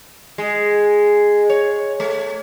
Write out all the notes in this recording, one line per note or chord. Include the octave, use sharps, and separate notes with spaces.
G#3
C#5
A3